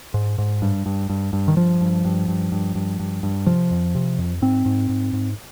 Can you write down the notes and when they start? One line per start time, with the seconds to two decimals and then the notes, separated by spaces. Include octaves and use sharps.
0.14 G#2
0.38 G#2
0.62 G2
0.86 G2
1.10 G2
1.33 G2
1.48 D#3
1.57 G2 F3
1.81 G2
2.05 G2
2.28 G2
2.52 G2
2.75 G2
3.00 G2
3.23 G2
3.47 C3 F3
3.71 F2
3.95 C3
4.19 F2
4.42 G#2 C4
4.66 G#2
4.89 G#2
5.13 G#2